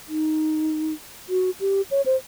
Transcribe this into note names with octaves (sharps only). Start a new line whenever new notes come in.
D#4
F#4
G4
C#5
C5